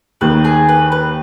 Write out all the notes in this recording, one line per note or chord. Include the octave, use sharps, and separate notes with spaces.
D#2 D#3 B4
G#4
B4
B4